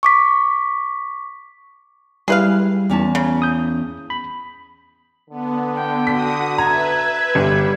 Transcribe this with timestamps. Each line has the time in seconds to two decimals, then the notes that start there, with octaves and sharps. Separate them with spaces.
0.03 C#6 D6 B6
2.28 G3 E4 G#4 B4 F5
2.90 E2 C#4 A5
3.15 C#3
3.42 D#6 G6
4.10 B5
5.30 D3 B3
5.75 G5
6.07 F#4 D#6 B6
6.58 B4 E5 A#5 G#6
7.35 G1 G3